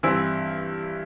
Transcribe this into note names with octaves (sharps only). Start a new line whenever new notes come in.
G2 E3 C4 E4